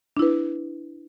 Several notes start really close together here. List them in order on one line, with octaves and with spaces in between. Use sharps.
D4 E4 B4